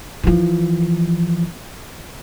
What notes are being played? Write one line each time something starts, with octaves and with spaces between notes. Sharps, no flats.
E3 F3